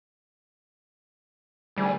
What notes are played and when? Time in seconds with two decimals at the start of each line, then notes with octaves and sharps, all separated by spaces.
1.77 D2 G3 G#4